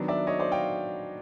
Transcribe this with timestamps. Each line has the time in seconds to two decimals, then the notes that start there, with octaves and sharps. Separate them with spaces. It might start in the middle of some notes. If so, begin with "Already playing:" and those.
Already playing: D#3 F#3 B3 D4
0.08 D5 E5
0.27 C#5 D#5
0.40 C5 D5
0.52 F5 G5